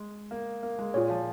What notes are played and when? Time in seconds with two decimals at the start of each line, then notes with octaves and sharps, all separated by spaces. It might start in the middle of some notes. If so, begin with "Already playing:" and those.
Already playing: G#3
0.31 A#3
0.63 A#3
0.79 G#3
0.94 A#2 F4 G#4 C#5
1.10 F3